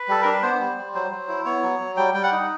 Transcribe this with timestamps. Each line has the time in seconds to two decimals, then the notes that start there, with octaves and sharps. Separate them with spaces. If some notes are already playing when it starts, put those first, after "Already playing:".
Already playing: B4
0.08 G3 A4
0.22 D4 A#4
0.32 B4
0.43 B3 C5
0.60 G3
0.78 G3
0.94 F#3 C5
1.11 F#3
1.29 E4
1.45 B3 C#5
1.63 F#3
1.80 F#3
1.97 G3 G5
2.14 G3 G5
2.23 F#5
2.32 D#4